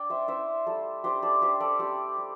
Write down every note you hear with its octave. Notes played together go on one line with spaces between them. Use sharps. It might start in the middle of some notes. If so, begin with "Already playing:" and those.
Already playing: D4 D5 G5
C5 E5
E4 C5 E5
G3 A4
D4 G4 C5
A4 D5
D4 G4 C5
A4 D5
G3 G4 C5
G3